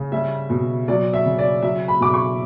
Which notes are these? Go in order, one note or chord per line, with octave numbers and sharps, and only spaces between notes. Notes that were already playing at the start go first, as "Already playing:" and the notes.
Already playing: C#3
G3 E5
B2
F#3 D5
E5
C#3
D5
F#3 E5
B5
B2 D6
C#6